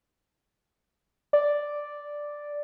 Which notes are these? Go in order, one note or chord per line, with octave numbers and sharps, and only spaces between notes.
D5